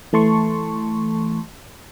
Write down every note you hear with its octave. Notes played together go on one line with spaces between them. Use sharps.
E3 A3 A5 C6 C#6